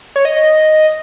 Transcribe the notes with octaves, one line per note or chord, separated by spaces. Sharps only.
C#5
D#5